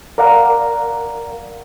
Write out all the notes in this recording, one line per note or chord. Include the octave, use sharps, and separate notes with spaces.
A#4 D5 F5 F#5 A#5